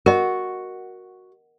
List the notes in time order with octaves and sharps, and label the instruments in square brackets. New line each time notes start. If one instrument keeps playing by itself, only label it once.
[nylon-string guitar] F#4 [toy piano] A#4 D#5